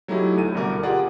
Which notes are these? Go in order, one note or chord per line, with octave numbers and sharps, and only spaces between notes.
F#3 A3 D#4 E4 G4 G#4
D2 D#7
C2 B2 D3 A#4 D6
F4 G4 G#4 A#4 D5 F#5